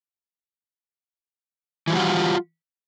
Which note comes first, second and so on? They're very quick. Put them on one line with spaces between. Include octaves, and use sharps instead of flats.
E3 F3 G3 F#4 F4